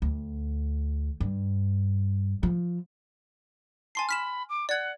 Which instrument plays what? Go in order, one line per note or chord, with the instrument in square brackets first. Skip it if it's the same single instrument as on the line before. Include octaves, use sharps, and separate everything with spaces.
[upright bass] D2
G2
F3
[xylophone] G#5 C6 C7 [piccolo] A5
[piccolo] B5 [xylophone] F6 B6 E7
[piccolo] D6
[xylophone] D5 G#6 [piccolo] F#5